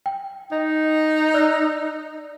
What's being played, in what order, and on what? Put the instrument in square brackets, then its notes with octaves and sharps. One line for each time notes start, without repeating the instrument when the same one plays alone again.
[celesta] G5
[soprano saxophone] D#4 [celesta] D#5
[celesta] D5 E6 F#6